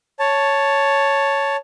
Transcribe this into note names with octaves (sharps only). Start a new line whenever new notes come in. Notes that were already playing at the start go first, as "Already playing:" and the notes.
C#5 A5